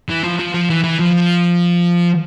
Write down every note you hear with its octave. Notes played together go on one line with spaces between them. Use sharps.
E3
F3
F3
F3
E3
E3
F3